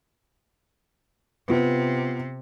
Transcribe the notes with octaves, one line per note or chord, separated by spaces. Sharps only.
C3 B3 F4